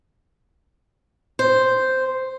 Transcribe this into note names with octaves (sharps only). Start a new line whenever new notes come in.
C5